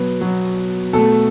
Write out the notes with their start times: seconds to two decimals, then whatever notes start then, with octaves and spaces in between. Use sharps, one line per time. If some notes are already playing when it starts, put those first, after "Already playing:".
Already playing: B2 F#3 B3 B4
0.21 B2 F#3 B3
0.93 B2 A4
0.98 A3